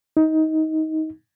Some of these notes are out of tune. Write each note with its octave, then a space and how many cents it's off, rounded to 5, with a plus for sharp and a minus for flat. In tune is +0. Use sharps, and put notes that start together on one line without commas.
D#4 +20